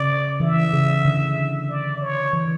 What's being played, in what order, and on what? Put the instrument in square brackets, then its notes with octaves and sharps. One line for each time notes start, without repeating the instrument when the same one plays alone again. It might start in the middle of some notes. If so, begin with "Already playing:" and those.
Already playing: [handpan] C#3 [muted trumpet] D5
[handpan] E3 [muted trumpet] E5
[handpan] C#3
D3
[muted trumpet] D5
C#5
[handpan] E3